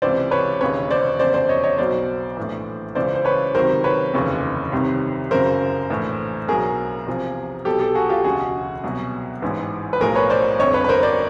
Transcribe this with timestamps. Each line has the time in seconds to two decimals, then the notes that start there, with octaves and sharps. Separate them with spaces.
0.02 C#2 C3 E3 C5 D5
0.31 B4 C#5
0.61 E1 D#2 C#3 B4 C#5
0.90 C5 D5
1.19 F1 E2 C#3 C5 D5
1.34 C5 D5
1.49 C#5 D#5
1.64 C#5 D#5
1.78 B1 B2 F#3 C5 D5
2.37 A#1 A2 E3
2.95 C#2 C#3 E3 C5 D5
3.15 C5
3.25 B4 C#5
3.55 C#2 C3 D#3 F#3 A#4 C5
3.84 B4 C#5
4.13 F1 D#2 C#3 E3
4.72 C2 C3 D#3
5.31 F#1 F#2 C#3 F#3 A#4 C5
5.90 A#1 A2 E3
6.48 B1 B2 F#3 G#4 A#4
7.07 E2 C3 F3
7.65 B1 B2 F#3 G4 A4
7.80 G4 A4
7.95 F#4 G#4
8.09 F4 G4
8.24 E1 D2 C#3 F#4 G#4
8.84 C2 B2 F#3
9.42 A1 G#2 E3
9.93 B4
10.01 B1 A2 F3 G#4 A#4
10.15 B4 C#5
10.30 C5 D5
10.59 G1 F2 D3 C#5 D#5
10.74 B4 C#5
10.84 B4
10.89 A#4 C5
11.03 C5 D5